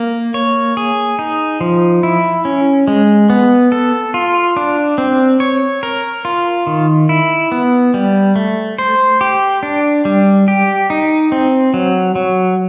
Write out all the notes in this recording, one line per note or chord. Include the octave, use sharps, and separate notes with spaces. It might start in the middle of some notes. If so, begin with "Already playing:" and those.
Already playing: A#3
C#5
G#4
D#4
F3
E4
C#4
G#3
B3
A4
F4
D4
C4
C#5
A#4
F4
D#3
E4
B3
G3
A3
C5
G4
D4
G3
G4
D#4
C4
F#3
F#3